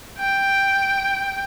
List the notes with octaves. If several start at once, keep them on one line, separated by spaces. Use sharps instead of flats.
G5